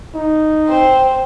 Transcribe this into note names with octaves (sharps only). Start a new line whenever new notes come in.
D#4
C4 C5